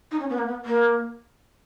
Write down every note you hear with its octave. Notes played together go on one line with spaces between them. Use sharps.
D#4
C#4
B3
A#3
B3
A#3